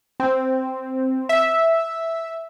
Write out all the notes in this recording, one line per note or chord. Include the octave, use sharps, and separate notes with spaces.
C4
E5